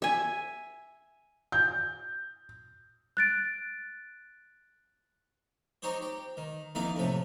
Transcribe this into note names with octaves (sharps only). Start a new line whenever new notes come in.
E5 G#5
G6
F#6 A6 D7
C4 D#4 G4 C5 C#5
G4
D#3
F2 E3 A#3 D#4 E5 F5
F2 A2 C3 A4